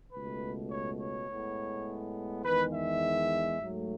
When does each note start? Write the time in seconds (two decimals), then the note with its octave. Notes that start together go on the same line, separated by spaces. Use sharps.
0.12 C#2 B2 A3 B4
0.70 C#5
0.99 C#5
1.28 A2 G#3 B3
2.44 E2 D#3 G#3 B4
2.73 E5
3.60 G#2 F#3 A3